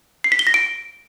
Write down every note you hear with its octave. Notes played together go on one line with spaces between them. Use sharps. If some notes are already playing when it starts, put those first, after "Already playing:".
C7
B6
G7
A#6
D7